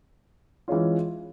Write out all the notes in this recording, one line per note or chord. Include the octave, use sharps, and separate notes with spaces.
E3 G#3 C#4 F4